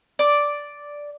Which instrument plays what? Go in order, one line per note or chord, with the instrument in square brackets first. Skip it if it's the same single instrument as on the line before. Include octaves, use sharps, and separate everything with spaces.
[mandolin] D5